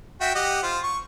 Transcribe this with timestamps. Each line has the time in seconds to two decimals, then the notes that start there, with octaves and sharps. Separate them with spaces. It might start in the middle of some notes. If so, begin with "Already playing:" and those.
0.21 F#4 E5 G5
0.35 G4 D#5 F#5
0.63 F4 C5
0.83 C#6